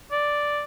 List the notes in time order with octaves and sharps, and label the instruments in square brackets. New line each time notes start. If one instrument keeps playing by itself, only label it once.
[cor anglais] D5